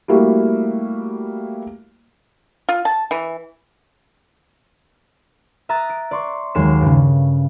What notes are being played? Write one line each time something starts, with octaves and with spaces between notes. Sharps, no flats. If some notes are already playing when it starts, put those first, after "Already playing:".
G3 A3 A#3 E4 F#4
F4
A5
E3
E5 A#5 D#6 F#6 A6
D7
D5 C6 C#6
D#2 F#3 G#3 C#5 C7 E7
G2 C#3